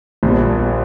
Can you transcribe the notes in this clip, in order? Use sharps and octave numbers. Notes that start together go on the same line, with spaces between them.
A#1 A#2 G3